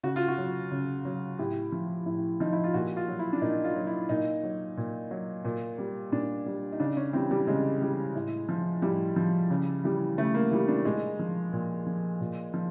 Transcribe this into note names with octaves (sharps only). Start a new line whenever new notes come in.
C#3 F#4
F4
F#4
F#3
C#3
F#3
A2 G4
F3
A2
F3 D#4
E4
F4
A#2 F#4
F4
F#3
E4
D4
A#2 D#4
F4
F#3
E4
A#2 D#4
F#3
A#2
F#3
A#2
G3
A#2 D4
G3
D#4
C#3 D4
C#4
E3 G3 C4
G3
C#3 G#3
E3 G3
A2
F3
A2 G3
F3
C#3
E3 G3
C#3 A3
A#3
E3 G3 A#3
D4
A#2 G#3
F3
A#2
F3
A#2
F3